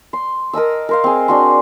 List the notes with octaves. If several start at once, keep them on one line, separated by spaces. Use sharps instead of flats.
C6
A#4 D#5 A5 E6
A#4 C5 F5
C4 G#4
D4 F#4 C6